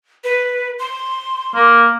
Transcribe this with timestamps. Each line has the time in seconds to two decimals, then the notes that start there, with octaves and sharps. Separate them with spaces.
0.24 B4
0.79 C6
1.55 A#3